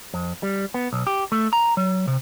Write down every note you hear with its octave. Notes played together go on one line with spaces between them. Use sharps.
F2
G3
B3
B1
G4
A3
A#5
F#3
C3